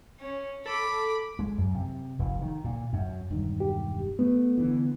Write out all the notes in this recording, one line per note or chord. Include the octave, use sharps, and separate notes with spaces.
C#4
A4 B5 D6
G#3
F#2
C3
F1
D#3
A#2
F#2
E1 G2 D#3
G4
A3 B3
D3 E3